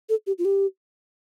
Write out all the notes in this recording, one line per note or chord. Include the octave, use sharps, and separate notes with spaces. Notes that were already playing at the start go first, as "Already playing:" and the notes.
A4
G4
F4
G4